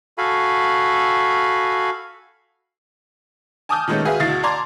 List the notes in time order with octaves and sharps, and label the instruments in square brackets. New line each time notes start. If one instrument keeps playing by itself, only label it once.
[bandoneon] F#4 A4 F5 G#5 B5
[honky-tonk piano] G#5 A5 D6 D#6 F6 G6
A#2 D#3 G#3 A3 B3 C#4
F#4 G#4 B4 E5 F5
D2 B2 E4 F5 A6 C7
D5 A5 A#5 C6 D6 G#6